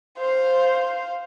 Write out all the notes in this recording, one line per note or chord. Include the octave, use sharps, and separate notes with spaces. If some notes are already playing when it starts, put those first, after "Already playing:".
C5 F5